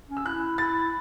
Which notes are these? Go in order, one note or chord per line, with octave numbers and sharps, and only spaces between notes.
C#4
E6
E4 F#6
E4 A6